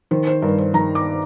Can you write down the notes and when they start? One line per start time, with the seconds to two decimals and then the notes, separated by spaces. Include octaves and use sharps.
0.11 D#3 C5
0.27 C5
0.42 G2 A#4
0.58 C5
0.74 D#3 A#5
0.95 D6